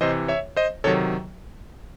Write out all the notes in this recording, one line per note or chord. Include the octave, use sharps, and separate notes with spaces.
C3 E3 C5 D#5
C#5 E5
C5 D#5
C3 D#3 F#3 A4 C#5